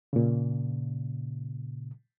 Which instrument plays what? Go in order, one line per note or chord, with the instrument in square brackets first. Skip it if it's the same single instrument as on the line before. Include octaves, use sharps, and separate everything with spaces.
[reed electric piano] A#2 C#3